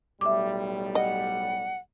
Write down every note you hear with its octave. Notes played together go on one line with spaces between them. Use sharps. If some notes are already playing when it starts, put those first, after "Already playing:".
B1 A2 G3 E5 D6
D#5 F#5